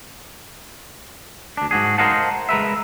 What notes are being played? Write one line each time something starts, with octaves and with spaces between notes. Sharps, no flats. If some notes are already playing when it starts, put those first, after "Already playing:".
D2 D4
G#2 F#4 G#4
A#4 C5 D#5 F5 F#5 A5
G#3 A#4 B4 E5